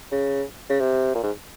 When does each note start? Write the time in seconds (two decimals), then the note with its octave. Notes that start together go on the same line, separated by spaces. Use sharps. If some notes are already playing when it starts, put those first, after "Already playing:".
0.12 C#3
0.70 C#3
0.80 C3
1.15 A#2
1.23 G#2